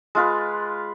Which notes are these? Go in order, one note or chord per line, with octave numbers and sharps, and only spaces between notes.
G#3 F4 B4